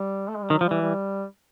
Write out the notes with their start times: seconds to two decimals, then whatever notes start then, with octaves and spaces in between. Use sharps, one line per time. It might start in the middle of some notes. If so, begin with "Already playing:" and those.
Already playing: G3
0.28 A3
0.36 G#3
0.43 G3
0.50 D#3 F#3
0.61 F3
0.66 E3 G3
0.82 G3